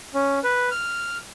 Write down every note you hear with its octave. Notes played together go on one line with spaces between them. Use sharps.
C#4
B4
F6